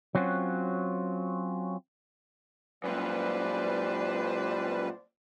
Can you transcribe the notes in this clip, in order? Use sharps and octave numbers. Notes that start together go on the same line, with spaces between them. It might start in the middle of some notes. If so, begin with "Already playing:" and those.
F#3 C4 C#4 F4 F#4
F#2 A#2 G3 B4 C5 D5